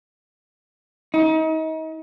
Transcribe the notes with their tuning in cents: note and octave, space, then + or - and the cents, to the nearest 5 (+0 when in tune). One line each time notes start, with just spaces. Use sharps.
D#4 +35